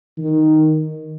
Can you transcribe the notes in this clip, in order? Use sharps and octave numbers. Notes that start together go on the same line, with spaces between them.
D#3